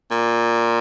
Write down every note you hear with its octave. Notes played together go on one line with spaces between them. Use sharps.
A#2